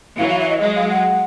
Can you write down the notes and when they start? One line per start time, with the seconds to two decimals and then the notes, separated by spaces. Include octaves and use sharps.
0.18 E3 F#3 F5
0.28 F5
0.39 E5
0.49 D#5
0.60 F#3 G#3 D#5
0.75 F5
0.89 F#5